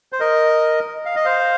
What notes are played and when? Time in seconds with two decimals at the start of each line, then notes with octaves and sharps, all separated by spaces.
0.13 C5
0.20 A#4 D#5
1.05 F5
1.16 D#5
1.25 C5 F5